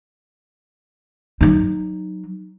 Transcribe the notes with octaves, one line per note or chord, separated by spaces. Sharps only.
F#3 D#4